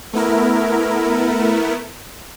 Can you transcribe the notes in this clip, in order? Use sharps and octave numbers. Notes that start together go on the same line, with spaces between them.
A3 B3 E4 A#4